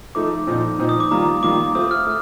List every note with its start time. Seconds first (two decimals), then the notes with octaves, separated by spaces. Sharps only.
0.15 F3 A3 D#4 A4 D6
0.47 A#2 F3 C4 D#4
0.79 A#2 F3 C4 D#4
0.89 D#6
1.00 D6
1.11 D#3 G3 A#3 F4 A#5
1.43 D#3 G3 A#3 F4 D6
1.75 A3 C4 F4 D#6
1.91 F6
2.07 A3